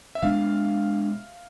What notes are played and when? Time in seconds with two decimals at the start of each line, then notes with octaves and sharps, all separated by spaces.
0.15 E5
0.22 B2 G#3 B3 D4 F5